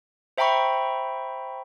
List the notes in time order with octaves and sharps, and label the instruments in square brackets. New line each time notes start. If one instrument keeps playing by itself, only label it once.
[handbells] C5 E5 G5 A#5 B5 C#6